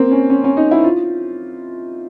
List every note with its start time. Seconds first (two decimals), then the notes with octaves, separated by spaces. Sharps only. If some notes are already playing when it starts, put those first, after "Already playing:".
Already playing: A#3 C4
0.11 C#4
0.30 C#4
0.44 C#4
0.57 D#4
0.71 E4
0.84 F4